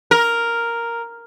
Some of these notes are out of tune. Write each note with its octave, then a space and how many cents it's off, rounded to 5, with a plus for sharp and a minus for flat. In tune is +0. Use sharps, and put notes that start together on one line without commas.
A#4 +0